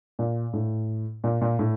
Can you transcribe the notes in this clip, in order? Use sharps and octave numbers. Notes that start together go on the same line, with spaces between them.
A#2
A2
A#2
A#2
A2